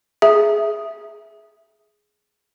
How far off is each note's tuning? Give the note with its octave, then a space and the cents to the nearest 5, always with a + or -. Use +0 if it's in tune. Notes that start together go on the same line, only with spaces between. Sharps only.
G#4 +10 E5 +0